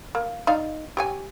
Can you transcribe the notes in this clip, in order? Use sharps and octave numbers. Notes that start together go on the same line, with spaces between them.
A#3
D#4 D5 F5
G4 C#5 G#5